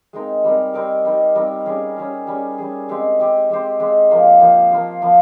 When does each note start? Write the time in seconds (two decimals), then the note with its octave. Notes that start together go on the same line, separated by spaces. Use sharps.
0.13 G#3 C4 D#4 A#4
0.44 G3 C4 D#4 A#4
0.74 G3 C4 D#4 A#4
1.05 G3 C4 D#4 A#4
1.35 G3 C4 D#4 A#4
1.66 G3 C#4 G#4
1.96 G3 C#4 G#4
2.27 G3 C#4 G#4
2.58 G3 C#4 G#4
2.88 G#3 C4 G4 C5
3.19 G#3 C4 G4 C5
3.49 G#3 C4 G4 C5
3.80 G#3 C4 G4 C5
4.10 F3 A#3 F4 C5
4.41 F3 A#3 F4 C5
4.71 F3 A#3 F4 C5
5.02 F3 A#3 F4 C5